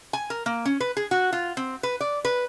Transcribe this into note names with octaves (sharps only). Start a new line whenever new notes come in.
G#5
A#4
A#3
C#4
B4
G#4
F#4
F4
C4
B4
D5
B4